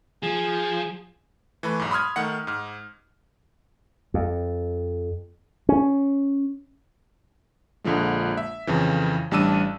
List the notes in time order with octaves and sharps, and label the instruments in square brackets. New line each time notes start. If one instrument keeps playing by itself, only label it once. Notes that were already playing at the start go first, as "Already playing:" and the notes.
[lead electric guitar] F3 [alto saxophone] G#4
[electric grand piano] E3 A3 B4
B1 G#2
B5 C6 D#6 F6 G#6
D#3 A3 F#5 C#7
G#2 F6
[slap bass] F2
C#4
[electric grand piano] A#1 D3 F3 G#3
E5
F2 C#3 E3
A1 G3 D4 A5 E6 D#7